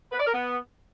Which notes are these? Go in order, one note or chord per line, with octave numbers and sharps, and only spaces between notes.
B4
D5
A#4
B3